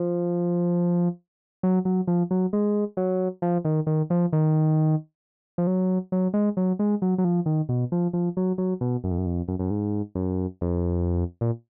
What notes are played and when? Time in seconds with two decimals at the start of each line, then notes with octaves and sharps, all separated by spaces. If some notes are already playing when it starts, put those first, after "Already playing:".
Already playing: F3
1.63 F#3
1.85 F#3
2.07 F3
2.31 F#3
2.53 G#3
2.97 F#3
3.42 F3
3.65 D#3
3.87 D#3
4.10 F3
4.33 D#3
5.58 F3
5.67 F#3
6.12 F#3
6.34 G#3
6.57 F#3
6.79 G#3
7.02 F#3
7.18 F#3
7.25 F3
7.46 D#3
7.69 B2
7.92 F3
8.13 F3
8.37 F#3
8.58 F#3
8.81 B2
9.04 F#2
9.11 F2
9.18 F#2
9.26 F2
9.48 F#2
9.59 F#2
9.71 G#2
10.15 F#2
10.61 F2
11.41 A#2